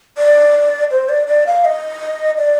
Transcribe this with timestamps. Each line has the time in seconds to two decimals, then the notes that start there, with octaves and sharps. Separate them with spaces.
0.18 D5
0.91 C5
1.09 D5
1.27 D5
1.47 F5
1.65 D#5
2.38 D5